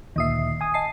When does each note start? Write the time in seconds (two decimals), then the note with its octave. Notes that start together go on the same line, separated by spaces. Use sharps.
0.16 D2 A#2 D#3 E5 D#6 C7
0.61 G#5 D#6
0.74 D#5 A5 C7